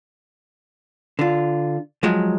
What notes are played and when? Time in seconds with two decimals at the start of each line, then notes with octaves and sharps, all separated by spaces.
1.19 D3 F4
2.03 F3 F#3 G#3